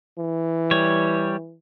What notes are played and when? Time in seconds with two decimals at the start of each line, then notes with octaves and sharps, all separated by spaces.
0.18 E3
0.71 G3 C#5